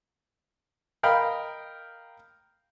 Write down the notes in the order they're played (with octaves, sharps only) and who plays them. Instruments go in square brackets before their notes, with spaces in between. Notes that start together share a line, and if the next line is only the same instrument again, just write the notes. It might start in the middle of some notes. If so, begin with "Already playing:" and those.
[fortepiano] A#4 D#5 F5 G5 B5